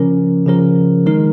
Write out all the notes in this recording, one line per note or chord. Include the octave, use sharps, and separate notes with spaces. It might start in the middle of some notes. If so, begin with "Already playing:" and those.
Already playing: C#3 F3 C#4 A#4
C#3 F3 C#4 A#4
D#3 G#3 D#4 A#4